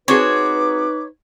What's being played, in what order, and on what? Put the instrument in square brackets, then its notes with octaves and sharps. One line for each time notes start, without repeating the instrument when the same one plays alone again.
[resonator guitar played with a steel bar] C4 F#4 G#4 [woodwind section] D#4 B4 [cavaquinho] C#5 [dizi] D6